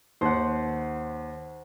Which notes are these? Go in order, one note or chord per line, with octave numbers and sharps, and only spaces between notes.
D#2 C5 F#5